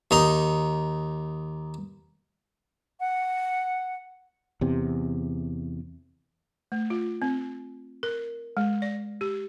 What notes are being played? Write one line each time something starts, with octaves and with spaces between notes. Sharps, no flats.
D#2 D#4 C6
F#5
E2 C3
A3
F4
C4
A#4
G#3
D5
G4